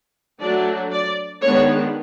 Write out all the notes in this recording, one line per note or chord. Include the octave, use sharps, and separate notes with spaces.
F#3 A3 D4 D5
D5
D#3 G#3 B3 D4 C#5